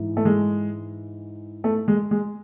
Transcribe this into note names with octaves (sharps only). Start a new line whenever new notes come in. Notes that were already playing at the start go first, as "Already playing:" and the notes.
Already playing: G#2 E3
A3
G#3
A3
G#3
G#3